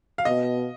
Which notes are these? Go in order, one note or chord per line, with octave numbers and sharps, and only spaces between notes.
F5
B2 D#5